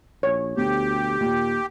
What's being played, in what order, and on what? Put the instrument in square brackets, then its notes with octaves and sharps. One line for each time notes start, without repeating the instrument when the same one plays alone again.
[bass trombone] A#1 [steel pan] C#5
[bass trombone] D2 [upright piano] B2 [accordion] G4
[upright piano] D#2 [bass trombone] A#2